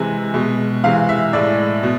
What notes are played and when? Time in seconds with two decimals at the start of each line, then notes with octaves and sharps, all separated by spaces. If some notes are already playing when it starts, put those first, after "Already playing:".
Already playing: C3 E3 G#3 G#5
0.34 B2 G#3
0.84 C3 E3 G#3 F5
1.09 E5
1.33 A2 G#3 D5
1.83 B2